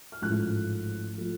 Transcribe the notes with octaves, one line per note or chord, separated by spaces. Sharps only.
F6
A1 G#2 F3 A3 F#6
F3 A3